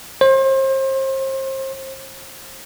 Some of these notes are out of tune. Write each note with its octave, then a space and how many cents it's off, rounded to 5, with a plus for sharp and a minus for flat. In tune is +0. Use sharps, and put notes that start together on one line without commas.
C5 +35